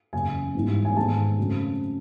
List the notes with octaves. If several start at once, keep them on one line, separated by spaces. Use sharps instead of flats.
F#1 E2 C#3 G#5
G#2 E3 G3 B3 D#4
G#5
G#2 D#3 G#3 B3 A5
F#2 C#3 F#3 A3 C4